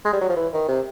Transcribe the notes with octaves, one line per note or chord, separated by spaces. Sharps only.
G#3
G3
F#3
F3
E3
D#3
C3